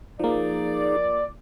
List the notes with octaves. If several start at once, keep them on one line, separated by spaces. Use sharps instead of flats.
F3 A#3 D#4 G#4 D5